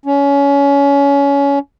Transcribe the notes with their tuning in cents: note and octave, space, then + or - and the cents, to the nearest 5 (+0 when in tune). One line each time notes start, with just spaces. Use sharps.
C#4 +25